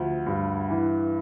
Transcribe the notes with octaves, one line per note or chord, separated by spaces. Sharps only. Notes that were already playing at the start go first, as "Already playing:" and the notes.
Already playing: D2 F3
G2
E3